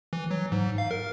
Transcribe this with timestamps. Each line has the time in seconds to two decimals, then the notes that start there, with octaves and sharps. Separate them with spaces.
0.13 E3
0.31 F#3
0.52 G#2
0.78 F5
0.91 A#4